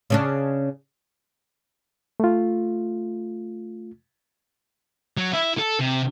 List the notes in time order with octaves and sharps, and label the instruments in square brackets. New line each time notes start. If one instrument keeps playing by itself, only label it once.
[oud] C#3 C#4 D4
[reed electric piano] A3 F4
[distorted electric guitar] F#3
E4
A4
C3